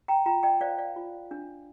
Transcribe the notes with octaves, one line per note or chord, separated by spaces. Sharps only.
G5 A#5
F4 G5 A#5
D#5 G5
C5 D5 F5
D5 F5
F4
D4